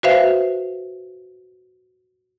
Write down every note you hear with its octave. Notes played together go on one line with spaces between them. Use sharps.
F#4 B4 C5 E5 F5